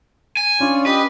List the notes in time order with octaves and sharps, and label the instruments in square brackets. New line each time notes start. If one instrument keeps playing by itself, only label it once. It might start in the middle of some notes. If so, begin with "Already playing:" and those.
[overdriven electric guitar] G#5
[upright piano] C#4 D4 [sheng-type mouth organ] F4 C#5 D5
[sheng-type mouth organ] G4 D#5 D#6 [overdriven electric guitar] B4